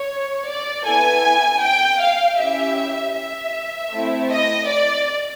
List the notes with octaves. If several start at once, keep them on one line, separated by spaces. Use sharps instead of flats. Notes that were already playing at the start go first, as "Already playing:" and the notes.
Already playing: C#5
D5
B3 E4 A4 G#5
G5
F5
C#4 E4 G4 E5
E5
A3 C4 E4
D#5
D5